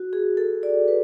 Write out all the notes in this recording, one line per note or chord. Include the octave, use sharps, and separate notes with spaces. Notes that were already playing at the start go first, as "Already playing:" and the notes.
Already playing: F#4
G#4
A4
D5
B4